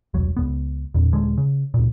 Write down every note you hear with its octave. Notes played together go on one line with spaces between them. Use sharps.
E1 C2 F#3
C#2 G2 B3
E2 A#2
D#1 D3 G#3
C#3
C#2 A#2